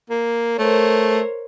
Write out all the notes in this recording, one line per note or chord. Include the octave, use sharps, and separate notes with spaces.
A#3
A3 A#4 C5 C#5